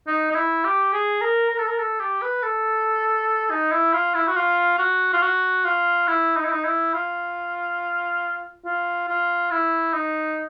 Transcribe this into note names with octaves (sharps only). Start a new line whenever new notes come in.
D#4
D#4
E4
G4
G#4
A#4
A#4
A4
A#4
A4
G4
B4
A4
D#4
E4
F4
E4
F#4
F4
F#4
F4
F#4
F4
E4
D#4
E4
D#4
E4
F4
F4
F4
E4
D#4